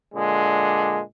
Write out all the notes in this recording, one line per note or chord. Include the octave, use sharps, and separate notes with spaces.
A#2 D3 G#3